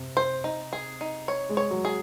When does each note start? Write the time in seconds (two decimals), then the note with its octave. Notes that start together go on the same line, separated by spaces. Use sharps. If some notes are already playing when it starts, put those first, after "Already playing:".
Already playing: C3 C4
0.17 C5
0.44 D#4
0.73 G#4
1.01 D#4
1.28 C#5
1.49 G#3
1.57 C#5
1.71 F#3
1.85 G#4